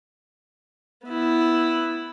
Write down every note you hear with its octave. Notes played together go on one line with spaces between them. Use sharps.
B3 E4